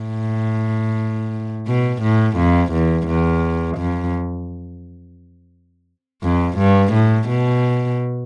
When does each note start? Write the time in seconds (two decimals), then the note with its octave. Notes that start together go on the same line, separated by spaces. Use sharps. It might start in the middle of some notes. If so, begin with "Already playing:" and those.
Already playing: A2
1.67 B2
2.02 A2
2.37 F2
2.73 E2
3.07 E2
3.78 F2
6.23 F2
6.58 G2
6.93 A2
7.29 B2